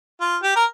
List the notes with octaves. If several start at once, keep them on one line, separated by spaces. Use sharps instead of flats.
F4
G4
A#4